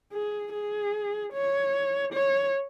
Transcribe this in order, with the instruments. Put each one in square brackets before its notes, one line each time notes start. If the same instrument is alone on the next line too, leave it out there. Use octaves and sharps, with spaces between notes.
[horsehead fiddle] G#4
G#4
C#5
C#5